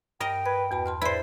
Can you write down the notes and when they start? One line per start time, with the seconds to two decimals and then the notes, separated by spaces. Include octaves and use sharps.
0.20 G2 A#4 D#5 G5
0.46 B4 G#6
0.71 E2 B2 A5 B5
0.86 A5 C6 F6
1.02 G#2 E4 B4 C5 D5